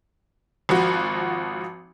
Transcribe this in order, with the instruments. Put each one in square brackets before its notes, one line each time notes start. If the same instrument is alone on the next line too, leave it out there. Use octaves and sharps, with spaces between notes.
[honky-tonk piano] G#1 F3 F#4